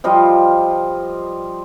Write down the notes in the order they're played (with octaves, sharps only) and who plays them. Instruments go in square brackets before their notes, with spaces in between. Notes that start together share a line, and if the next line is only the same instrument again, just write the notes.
[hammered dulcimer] F3 G3 F4 D#5